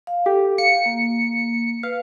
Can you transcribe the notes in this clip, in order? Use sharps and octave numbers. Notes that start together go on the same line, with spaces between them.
F5
G4 A4
F5 C#7
A#3
B4 F5